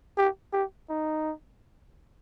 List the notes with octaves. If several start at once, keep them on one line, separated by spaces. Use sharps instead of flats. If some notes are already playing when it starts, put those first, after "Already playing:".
G4
G4
D#4